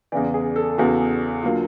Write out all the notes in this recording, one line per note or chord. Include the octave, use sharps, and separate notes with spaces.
E2 C#3 E3 D5
G#4
A4
E2 C#3 E3 F#4
D3 F#3 A#3 F4